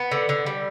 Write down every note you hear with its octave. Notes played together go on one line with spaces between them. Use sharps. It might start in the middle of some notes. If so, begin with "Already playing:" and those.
Already playing: B3
D3
D3
G3